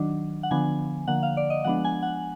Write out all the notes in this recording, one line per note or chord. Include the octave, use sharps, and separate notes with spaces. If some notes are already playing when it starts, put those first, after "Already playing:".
Already playing: D#3 F#3 D4
F#5
D3 F3 B3 D4 G#5
D3 F3 A#3 F#5
F5
D5
D#5
F3 G#3 B3 D4 F#5
G#5
F#5